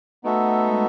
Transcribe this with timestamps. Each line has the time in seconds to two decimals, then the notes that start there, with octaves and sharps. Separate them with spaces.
0.24 A3 B3 D#4 F#4 A4 E5
0.67 G#3